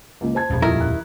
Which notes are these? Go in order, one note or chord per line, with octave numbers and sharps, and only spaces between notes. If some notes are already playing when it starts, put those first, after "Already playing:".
C#2 A#3
C5 A5 G#6
D#1 F2
D#3 F3 A3 E4 A#4
F#6